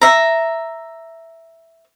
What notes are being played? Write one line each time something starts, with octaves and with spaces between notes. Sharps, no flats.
E5 A#5